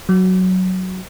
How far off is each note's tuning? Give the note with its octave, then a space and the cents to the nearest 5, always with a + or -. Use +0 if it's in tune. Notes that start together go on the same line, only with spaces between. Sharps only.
F#3 +5